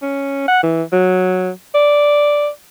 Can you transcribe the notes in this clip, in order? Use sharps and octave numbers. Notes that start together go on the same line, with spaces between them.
C#4
F#5
E3
F#3
D5